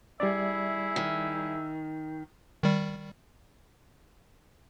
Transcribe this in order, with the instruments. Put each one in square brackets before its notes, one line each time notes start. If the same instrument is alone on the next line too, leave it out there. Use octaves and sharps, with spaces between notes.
[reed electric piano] G3 D5 [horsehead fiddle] E4 G#4 [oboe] E5
[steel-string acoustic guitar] D#3
[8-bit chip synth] D#3 G3